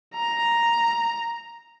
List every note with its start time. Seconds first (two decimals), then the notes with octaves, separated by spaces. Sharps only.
0.15 A#5